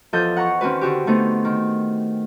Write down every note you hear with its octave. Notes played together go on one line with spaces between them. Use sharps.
E2 F3 A4 D#5 G6
F#5 A#5 C#6
D#3 C4 C#4 F#4 B4
D3 F#4 G4
D3 A3 B3 C4 D#4
D#3